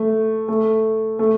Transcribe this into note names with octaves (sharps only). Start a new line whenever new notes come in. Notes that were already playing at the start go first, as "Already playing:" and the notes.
Already playing: A3
A3
A3